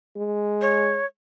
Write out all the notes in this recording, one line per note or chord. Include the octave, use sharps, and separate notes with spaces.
G#3
C#5